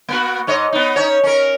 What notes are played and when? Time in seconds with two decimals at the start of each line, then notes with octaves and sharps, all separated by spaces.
0.09 A#3 B3 F#4
0.47 G#2 C#5 D#5
0.73 B3 D#4
0.96 C#4 D#4 C#5
1.23 C#4 A#4